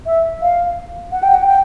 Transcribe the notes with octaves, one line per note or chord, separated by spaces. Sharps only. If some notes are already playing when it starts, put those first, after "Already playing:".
E5
F5
F#5
G5
F#5
G5